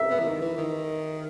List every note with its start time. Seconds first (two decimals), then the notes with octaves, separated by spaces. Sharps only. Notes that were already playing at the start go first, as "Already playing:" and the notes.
Already playing: E5
0.10 B3
0.19 E3
0.25 D#3
0.41 E3
0.57 D#3